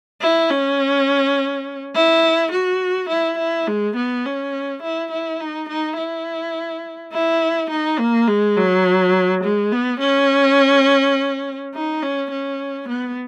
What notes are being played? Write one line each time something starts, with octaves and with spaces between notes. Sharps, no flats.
E4
C#4
E4
F#4
E4
E4
G#3
B3
C#4
E4
E4
D#4
D#4
E4
E4
D#4
A#3
G#3
F#3
G#3
B3
C#4
D#4
C#4
C#4
B3